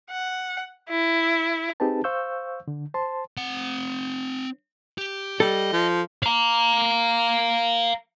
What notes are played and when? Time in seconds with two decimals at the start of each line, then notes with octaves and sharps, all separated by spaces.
0.11 F#5
0.90 E4
1.80 C4 D#4 G4 G#4 B4 A5
2.04 C5 F5 C#6 E6 G6
2.68 D3
2.94 C5 A5 C6
3.37 C4 F#5
4.98 G4
5.40 G3 A4 D#5
5.73 F3
6.23 F5 A#5